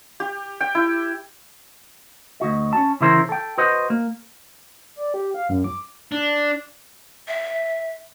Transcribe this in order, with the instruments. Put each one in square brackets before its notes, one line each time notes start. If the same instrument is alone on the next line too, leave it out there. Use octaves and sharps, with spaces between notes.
[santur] G4
G5
E4
[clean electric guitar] D2 F#4 D#5
C#4 A5
C#3 E3 C#4 E4 A#4 C5
A4 G5
F#4 B4 C5 D#5
A#3
[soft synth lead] D5
G4
F5
F#2
D6
[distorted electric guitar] D4
[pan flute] E5